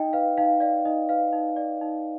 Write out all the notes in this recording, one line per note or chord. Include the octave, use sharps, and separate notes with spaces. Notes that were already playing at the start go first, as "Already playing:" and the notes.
Already playing: D#4 D#5 G5
B4 F5
D#4 F5
D5 F5
D#4 D#5
B4 F5
D#4
D5
D#4